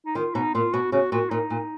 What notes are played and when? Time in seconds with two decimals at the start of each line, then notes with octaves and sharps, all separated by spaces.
0.06 D#4
0.15 D#3 F4
0.35 B2 D#4
0.54 A#2 F4
0.73 B2 F#4
0.92 C#3 F#4
1.12 A#2 F#4
1.30 A#2 D#4
1.50 A#2